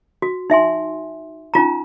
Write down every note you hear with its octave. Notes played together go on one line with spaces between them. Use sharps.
F#4
D#4 E5 G#5 C6
C#4 D#4 F4 A#5